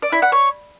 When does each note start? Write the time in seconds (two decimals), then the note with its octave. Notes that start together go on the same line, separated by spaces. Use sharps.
0.02 D5
0.12 E4
0.22 F#5
0.32 C#5